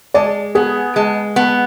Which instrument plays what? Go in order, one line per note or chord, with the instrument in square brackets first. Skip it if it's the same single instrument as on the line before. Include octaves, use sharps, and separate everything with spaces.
[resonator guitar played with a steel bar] G#3 [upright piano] D5
[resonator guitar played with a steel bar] B3 [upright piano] G#4
[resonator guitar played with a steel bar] G#3
B3